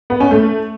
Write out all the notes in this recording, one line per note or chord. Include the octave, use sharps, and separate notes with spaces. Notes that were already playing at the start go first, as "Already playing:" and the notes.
B3
C#4
A3